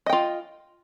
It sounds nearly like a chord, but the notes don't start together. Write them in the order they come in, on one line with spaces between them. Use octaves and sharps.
D#5 G5 F4